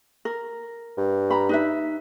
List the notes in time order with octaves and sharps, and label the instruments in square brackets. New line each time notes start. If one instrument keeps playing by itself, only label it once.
[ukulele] A#4
[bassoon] G2
[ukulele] A#5 B5
D#4 B4 E5